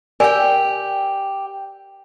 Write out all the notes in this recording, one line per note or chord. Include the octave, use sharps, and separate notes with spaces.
G4 A#4 D5 G5 G#5